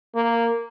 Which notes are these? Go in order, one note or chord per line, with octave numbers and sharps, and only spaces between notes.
A#3